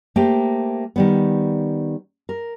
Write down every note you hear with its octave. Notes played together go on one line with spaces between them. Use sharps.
A3 A#3 G4 C5 G5
D#3 G3 B3
A#4